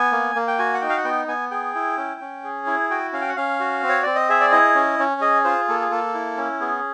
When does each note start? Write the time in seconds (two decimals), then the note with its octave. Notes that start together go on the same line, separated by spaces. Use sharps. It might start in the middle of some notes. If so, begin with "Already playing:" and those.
Already playing: B3 G#5
0.12 A#3
0.35 A#3
0.48 G5
0.58 F#4 G#5
0.74 F#5
0.81 D#4 G5
0.89 F5
0.98 F#5
1.04 B3 G5
1.27 B3 G#5
1.51 G#4 G5
1.75 E4
1.97 C#4
2.21 C#4
2.44 G#4
2.66 E4
2.90 F#4 G5
3.13 C#4 F5
3.21 G5
3.29 F#5
3.36 C#4 F5
3.60 F#4
3.83 C4
3.89 C#5
4.03 C4 D5
4.15 D#5
4.29 G#4 E5
4.40 D5
4.52 E4 D#5
4.75 C#4
4.99 C#4
5.21 G#4 D#5
5.44 F4 C5
5.68 A#3 A4
5.81 G#4
5.91 A#3 A4
6.14 E4
6.37 C#4
6.61 B3 G#4